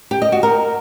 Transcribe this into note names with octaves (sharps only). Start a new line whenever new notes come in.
G4
D#5
F#4
A#4